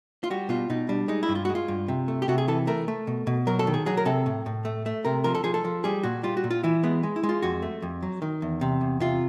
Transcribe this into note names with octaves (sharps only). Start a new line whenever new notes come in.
F4
G3 F#4
B2 F4
B2 D#4
G3 D4
G#3 D#4
E4
G2
F4
G#3 F#4
F4
G2
C3
A3
G4
C3 F#4
G#4
E3 A4
A3 A#4
A3
B2
B2
F#3 A#4
A4
D#3
G#4
F#3 G#4
A#4
C3 A4
A2
A2
A3
A3
C3 A#4
F3 A#4
A4
F3 G#4
A4
F3
G3 G#4
A#2 F#4
G3 F4
F#4
A#2
F4
E3 E4
G#3 B3
G#3
E4
G#3
F4
F2 F#4
A3
F2
F#3
D#3
E2
C3
E2
C3 F4